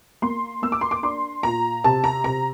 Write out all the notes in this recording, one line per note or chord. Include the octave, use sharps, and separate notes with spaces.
A#3 C6
A#3 E6
D6
C6
D6
D4 C6
A#2 A#5
C3 A5
A#5
C3 A#5